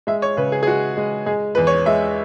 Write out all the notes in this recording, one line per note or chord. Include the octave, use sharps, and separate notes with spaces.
G#3 E5
C#5
C#3 B4
G#4
G#4
G#3 F#4
G#3
G#3 G#4
E2 B4
C#5
G#3 E5